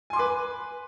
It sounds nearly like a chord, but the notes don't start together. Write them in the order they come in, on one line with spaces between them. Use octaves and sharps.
G#5 C6 D6 B4